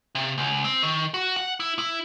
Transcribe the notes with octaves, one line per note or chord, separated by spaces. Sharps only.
C3
C#2
C4
D#3
F#4
F#5
E4
E4